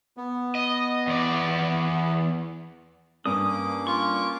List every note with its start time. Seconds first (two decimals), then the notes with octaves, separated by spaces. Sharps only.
0.17 B3
0.55 D#5
1.07 E2 D5
3.26 G2 A#3 C#4 D6 D#6
3.87 F4 C#6